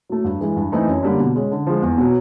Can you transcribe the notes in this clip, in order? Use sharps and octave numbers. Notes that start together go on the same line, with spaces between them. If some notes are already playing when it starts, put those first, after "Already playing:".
F#3 A3
G2
E3 G#3
G2
E3 A3 C4 D#4
F#2
D3 G3 A#3 D4
B2
G#3 C#4
D3
F3 G#3
E2
B2 F#3